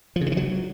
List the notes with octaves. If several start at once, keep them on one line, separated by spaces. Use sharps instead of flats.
F3
C#3
D#3
E3
F#3